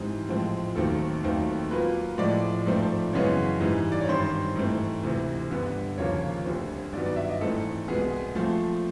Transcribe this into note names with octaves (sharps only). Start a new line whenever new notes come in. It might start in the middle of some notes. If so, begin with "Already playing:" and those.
Already playing: G#2 E3 G3 C4
A2 F3 G#3 C4
D#2 D#3 F#3 A3 C4 A4
D#2 D#3 F#3 A3 C4
A#2 F#3 A#3 B4
A2 F3 G#3 D5
G#2 F3 A3 C4
F#2 C#3 E3 G#3 B3 C#5
G#2 E3 G3
D5
C#5
G2 D#3 G3 C4 C5
G#2 E3 A3 C4
D2 C3 E3
G2 D3 G3 B3
D#2 C#3 F3 A#3 C#5
D2 D3 G3 C4
G2 D#3 F#3 B3 D5
D5
E5
D#5
G#2 E3 A3 C4 A4
C2 B2 G#3 B3 G#4
A#2 F3 A3 C4